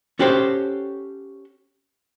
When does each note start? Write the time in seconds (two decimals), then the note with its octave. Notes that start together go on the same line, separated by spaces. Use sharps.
0.19 C#4 F#4 G4 A4 C5